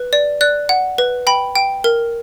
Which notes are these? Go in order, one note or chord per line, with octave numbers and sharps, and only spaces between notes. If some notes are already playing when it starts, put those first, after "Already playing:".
Already playing: B4
D5
D5 F#6
F#5
B4
G5 B5
G5
A#4